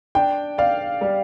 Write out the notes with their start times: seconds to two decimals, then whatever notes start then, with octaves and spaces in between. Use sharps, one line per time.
0.15 D4 G5
0.58 D5 F5
1.01 G3